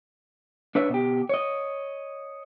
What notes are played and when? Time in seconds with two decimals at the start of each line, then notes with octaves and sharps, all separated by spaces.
0.75 D4 B4 C#5 E5
0.90 B2 G4
1.29 C#5 D#5